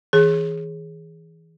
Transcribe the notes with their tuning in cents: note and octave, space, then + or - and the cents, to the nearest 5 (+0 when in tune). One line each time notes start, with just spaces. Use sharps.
E3 -30 G#4 +0